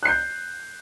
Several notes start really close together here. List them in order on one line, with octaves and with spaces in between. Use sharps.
F#6 C7 G6